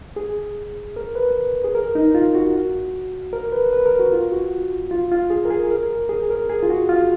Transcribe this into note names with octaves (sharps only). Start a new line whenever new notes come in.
G#4
A#4
B4
G#4
A#4
D#4
F4
F#4
A#4
B4
B4
A#4
F#4
F4
F#4
F4
F4
G#4
A#4
G#4
A#4
G#4
A#4
G#4
F4
F#4
F4